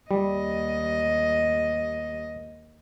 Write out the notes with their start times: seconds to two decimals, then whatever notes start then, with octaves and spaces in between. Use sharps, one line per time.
0.11 D#2 G3 D#5